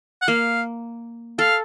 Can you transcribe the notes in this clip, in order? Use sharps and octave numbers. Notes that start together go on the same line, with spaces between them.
F#5
A#3 F5
A4 F5